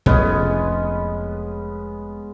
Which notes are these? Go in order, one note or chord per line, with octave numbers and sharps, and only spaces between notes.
F1 C2 F2 B2 G#3 B3 C#4